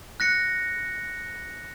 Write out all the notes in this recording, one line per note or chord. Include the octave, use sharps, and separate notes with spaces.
F#6 A#6 C#7